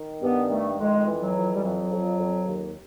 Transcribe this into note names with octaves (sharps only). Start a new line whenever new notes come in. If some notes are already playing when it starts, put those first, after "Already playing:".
Already playing: D#3
G2 B3
D#3 A3
F2 G#3
E3
F#3
F2
G3
F2 F#3
F2
F2
D#2